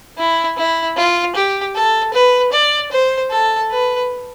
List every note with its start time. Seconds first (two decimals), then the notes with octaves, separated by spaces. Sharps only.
0.18 E4
0.57 E4
0.96 F4
1.35 G4
1.75 A4
2.13 B4
2.52 D5
2.91 C5
3.31 A4
3.71 B4